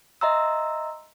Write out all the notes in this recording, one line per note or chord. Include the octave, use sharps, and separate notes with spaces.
D#5 E5 A#5 C6 E6